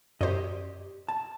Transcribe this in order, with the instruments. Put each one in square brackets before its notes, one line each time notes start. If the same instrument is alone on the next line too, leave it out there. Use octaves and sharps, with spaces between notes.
[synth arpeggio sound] F#2 C5 [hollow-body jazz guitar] G4 D5 D#5
[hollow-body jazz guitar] A5